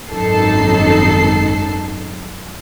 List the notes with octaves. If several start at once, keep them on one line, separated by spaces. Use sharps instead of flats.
G#1 F#2 D#4 A4 C7